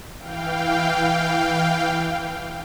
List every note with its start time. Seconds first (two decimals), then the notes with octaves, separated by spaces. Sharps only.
0.19 E3 F5 G5